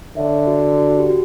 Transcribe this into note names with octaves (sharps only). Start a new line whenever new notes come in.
D3 C#5 E5
F#4
F#4
F#4
G4
F#4